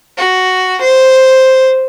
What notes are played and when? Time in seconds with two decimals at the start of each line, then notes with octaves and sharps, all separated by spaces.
0.17 F#4
0.81 C5